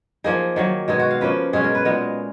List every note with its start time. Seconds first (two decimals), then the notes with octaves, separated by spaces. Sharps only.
0.24 F3 A#3 D#4 G#4
0.56 D#3 F#3 A#3
0.88 B2 G#3 D#4 G#4
0.99 F#4
1.11 F5
1.21 C#3 F3 A#3 C#4 B4
1.53 B2 G#3 C#4 G#4
1.64 A#4
1.75 B4
1.85 A#2 G#3 B3 D#4 A#4